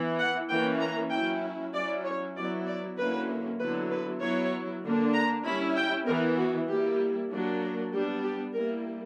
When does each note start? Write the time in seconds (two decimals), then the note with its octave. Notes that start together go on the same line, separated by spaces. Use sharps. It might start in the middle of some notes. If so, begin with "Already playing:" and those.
Already playing: E3 B3 E4
0.19 F#5
0.50 E3 A#3 C#4 G5
0.81 A#5
1.11 F#3 C#4 E4 G5
1.73 F#3 C#4 E4 D5
2.05 C#5
2.36 F#3 B3 E4 D5
2.66 D5
2.97 D3 F#3 A#3 C#4 E4 B4
3.59 D3 F#3 B3 E4 B4
3.90 B4
4.21 F#3 B3 E4 C#5
4.83 D3 A#3 D4
5.13 A#5
5.45 G3 C#4 E4 B5
5.75 G5
6.06 E3 B3 E4 A#4
6.38 F#4
6.68 G3 A#3 E4 G4
7.30 F#3 A#3 D4
7.61 A#4
7.92 G3 B3 D4 G4
8.23 G4
8.54 G3 A#3 E4 A#4